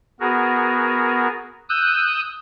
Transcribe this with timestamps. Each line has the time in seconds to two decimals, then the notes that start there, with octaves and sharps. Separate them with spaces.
0.20 B3 F#4 G#4 A#4
1.69 D#6 E6 F#6 G6